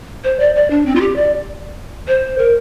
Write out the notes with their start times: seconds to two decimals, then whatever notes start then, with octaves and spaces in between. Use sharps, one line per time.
0.24 C5
0.40 D5
0.56 D5
0.70 D4
0.86 C4
0.96 F4
1.01 G4
1.16 D5
2.08 C5
2.38 A#4